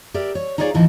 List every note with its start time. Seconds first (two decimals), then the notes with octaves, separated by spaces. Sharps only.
0.14 G4 A#4 D5 E5
0.35 C#5
0.58 D#4 F4 G#4 C#5 D5 F5
0.74 D#2 A2 E3 F3 D#4 A5